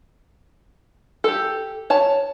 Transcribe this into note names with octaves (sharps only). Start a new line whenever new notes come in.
G4 A4
C#5 A5